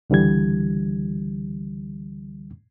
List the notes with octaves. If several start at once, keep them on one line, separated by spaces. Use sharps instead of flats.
C#2 D3 E3 G3 G#6